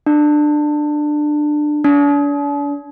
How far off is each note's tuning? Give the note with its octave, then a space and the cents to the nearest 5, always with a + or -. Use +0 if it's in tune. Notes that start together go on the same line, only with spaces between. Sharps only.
D4 +20
D4 -40